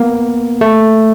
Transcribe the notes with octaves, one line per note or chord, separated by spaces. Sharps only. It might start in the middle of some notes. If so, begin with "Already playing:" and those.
Already playing: A#3 B3
A3